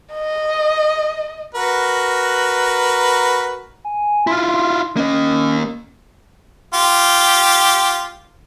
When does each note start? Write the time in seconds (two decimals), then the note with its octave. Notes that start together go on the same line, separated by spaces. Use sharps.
0.13 D#5
1.55 F#4 A#4 B4
3.85 G#5
4.27 E4 F4 C6
4.97 A#3 C#4 D#5
6.74 F4 G4